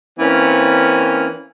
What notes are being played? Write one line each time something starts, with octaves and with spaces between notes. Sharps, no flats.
E3 A#3 C4 C#4